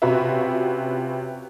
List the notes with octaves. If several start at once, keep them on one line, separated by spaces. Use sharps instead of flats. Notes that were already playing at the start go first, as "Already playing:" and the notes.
C3 C#4 F4 F#4 B4 E5